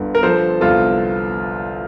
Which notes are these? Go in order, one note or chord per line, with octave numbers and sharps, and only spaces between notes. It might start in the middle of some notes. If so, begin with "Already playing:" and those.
Already playing: G1 D3
A#4
F3 A4 C5
C2 F4 A4